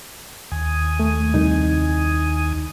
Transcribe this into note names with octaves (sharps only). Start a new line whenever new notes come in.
D#2 G#5 D#6
A3
C2 D#4